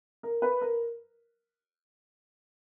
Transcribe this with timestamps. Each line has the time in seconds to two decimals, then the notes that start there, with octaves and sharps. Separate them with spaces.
0.23 A#4
0.42 B4
0.61 A#4